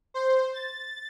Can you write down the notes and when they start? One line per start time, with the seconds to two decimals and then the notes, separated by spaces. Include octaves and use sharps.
0.14 C5
0.54 A6